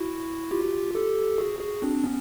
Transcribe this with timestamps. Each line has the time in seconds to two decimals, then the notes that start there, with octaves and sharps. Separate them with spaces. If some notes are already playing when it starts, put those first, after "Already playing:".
Already playing: E4 F#4
0.51 F4 G4
0.95 G4 A4
1.38 F#4 G#4
1.60 F#4 G#4
1.82 C4 D4
2.04 B3 C#4